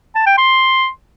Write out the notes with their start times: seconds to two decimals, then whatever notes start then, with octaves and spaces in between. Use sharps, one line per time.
0.15 A5
0.26 G5
0.38 C6